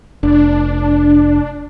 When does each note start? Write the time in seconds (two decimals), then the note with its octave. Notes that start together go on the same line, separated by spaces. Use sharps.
0.23 F1 D4